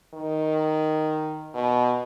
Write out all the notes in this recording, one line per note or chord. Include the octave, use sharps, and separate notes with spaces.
D#3
B2